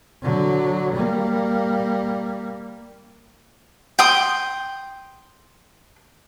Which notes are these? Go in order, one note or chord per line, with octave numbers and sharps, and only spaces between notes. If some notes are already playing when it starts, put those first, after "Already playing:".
D3 F#3
G3 A#3
G5 C6 D#6